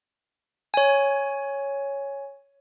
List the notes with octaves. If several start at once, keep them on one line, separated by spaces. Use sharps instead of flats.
C#5 G#5